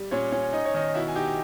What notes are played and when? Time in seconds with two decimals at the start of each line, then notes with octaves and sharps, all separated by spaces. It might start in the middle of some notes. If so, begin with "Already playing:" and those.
Already playing: G3
0.11 A#2 C#4 C#5
0.32 C#4
0.53 D#4 D#5
0.65 C#5
0.74 D#3 D#4 D#5
0.95 B2 E4 E5
1.08 G#5
1.15 D#4 G4 G5